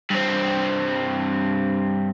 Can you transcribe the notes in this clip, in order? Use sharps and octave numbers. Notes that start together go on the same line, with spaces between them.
G2 C4